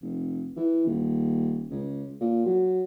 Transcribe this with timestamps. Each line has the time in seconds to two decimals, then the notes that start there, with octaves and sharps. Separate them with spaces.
0.01 F1
0.57 E3
0.86 D#1
1.71 C#2
2.21 A#2
2.46 F#3